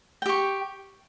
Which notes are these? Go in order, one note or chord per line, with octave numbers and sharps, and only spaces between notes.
G4 G5 C#6